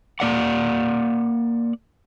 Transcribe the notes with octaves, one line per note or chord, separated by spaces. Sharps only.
A#3 D5 F#5